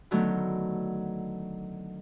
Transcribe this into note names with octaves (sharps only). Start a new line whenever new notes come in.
D3 D#3 F#3 A3 B3